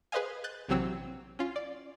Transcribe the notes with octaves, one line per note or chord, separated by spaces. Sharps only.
G#4 B4 C5 D#5 F5 G#5
F#6 G6 A6
A#1 C3 E3 F#3 C4 E6
C#4 F4
D5